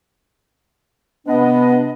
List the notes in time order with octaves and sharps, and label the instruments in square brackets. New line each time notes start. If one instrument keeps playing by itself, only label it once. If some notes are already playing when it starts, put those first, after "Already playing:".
[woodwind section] C3 D4 D#5 [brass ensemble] B3